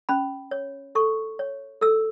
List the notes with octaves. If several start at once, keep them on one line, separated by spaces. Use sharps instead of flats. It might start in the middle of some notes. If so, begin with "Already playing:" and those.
C#4 B5
C#5
A4 C#6
C#5
A4 E6